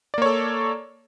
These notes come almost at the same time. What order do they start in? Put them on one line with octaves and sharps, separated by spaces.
D5 A#3 C#5 A4